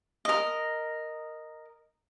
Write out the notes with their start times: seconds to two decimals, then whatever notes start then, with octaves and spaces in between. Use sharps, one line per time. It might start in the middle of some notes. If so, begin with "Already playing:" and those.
0.25 A#4 D#5